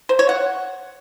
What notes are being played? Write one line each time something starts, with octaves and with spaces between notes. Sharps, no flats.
C5
C#5
F#5